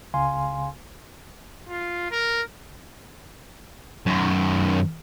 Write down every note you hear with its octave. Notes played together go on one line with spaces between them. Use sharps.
C#2 C#3 F5 G#5 C6
F4
A#4
F#2 D#3